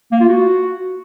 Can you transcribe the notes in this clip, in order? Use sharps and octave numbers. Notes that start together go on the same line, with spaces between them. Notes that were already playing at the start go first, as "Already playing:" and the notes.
A#3
F4
F#4